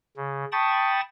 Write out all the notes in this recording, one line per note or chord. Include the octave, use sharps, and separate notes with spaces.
C#3
G5 A5 B5 C#6 D#6 A6